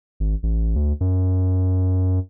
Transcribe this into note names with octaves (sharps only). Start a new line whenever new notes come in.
G#1
A1
D2
F#2